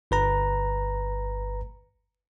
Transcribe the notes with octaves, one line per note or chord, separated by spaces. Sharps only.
G1 B4 A#5